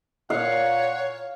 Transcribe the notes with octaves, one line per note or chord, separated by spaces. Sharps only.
A#2 C#5 F5 F#5